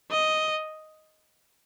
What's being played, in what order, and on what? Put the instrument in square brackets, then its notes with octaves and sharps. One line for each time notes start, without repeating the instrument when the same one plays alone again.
[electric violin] D#5